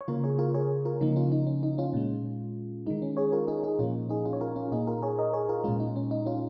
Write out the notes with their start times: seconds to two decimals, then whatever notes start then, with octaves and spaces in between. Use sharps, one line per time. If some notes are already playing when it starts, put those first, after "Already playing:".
0.01 C#5
0.08 C#3 A#3 F4 A#4
0.24 G#4 C#5
0.39 F4 A#4
0.54 G#4 C#5
0.85 F4 A#4
1.01 C#3 F3 A#3 D#4
1.16 C#4 F4
1.32 D#4
1.47 C#4
1.63 D#4
1.78 C#4 F4
1.93 A#2 G#3
2.86 D#3 G#3 D#4
3.02 C#4
3.17 G#4 C#5
3.32 F4 A#4
3.48 D#4 G#4
3.63 D#4 G#4
3.79 A#2 F3 A#3 C#4 F4
4.09 D#4 G#4
4.25 C#4 F4
4.33 C#5
4.41 F4 A#4
4.56 C#4 F4
4.72 A#2 A#3 D#4 G#4
4.87 F4 A#4
5.02 G#4 C#5
5.19 A#4 D#5
5.33 G#4 C#5
5.49 F4 A#4
5.64 A#2 G#3 C#4 F4
5.80 D#4
5.96 C#4
6.11 D#4
6.26 C#4 F4